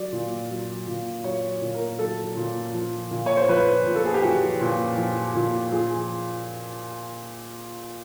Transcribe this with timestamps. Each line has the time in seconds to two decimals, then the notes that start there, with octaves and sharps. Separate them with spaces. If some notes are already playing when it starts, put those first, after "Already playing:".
Already playing: F#3 D5
0.12 A#2
0.50 F#3
0.88 A#2
1.24 F#3 C#5
1.62 A#2
1.74 A#4
1.99 F#3 A4
2.37 A#2
2.74 F3
3.11 A#2
3.26 C#5
3.37 C5
3.49 F3 B4
3.86 A#2
3.96 A4
4.05 G#4
4.14 G4
4.23 F3 F#4
4.61 A#2
4.97 F3
5.35 A#2
5.72 F3 G#4